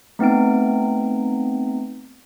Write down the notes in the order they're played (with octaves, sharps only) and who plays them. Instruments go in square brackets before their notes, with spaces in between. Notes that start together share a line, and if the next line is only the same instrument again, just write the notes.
[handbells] A3 B3 C4 D#4 D7